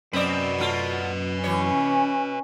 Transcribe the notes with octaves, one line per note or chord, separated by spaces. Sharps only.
F#2 C4 B4 D5 D#5
F#3 A3 F4
E3 C#4 C#5